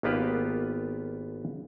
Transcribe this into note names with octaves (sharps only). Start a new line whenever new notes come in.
G#1 A#3 B3 F4 G4 B4